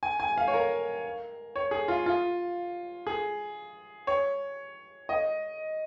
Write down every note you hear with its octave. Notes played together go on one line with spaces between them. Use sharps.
G#5
G#5
F5
C#5
A#4
C#5
G#4
F4
F4
G#4
C#5
D#5